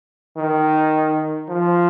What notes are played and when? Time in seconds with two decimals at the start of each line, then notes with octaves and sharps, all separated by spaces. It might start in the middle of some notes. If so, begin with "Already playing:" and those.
0.37 D#3
1.49 F3